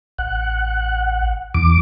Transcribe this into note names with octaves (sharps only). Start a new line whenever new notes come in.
A1 F#5
E2 D6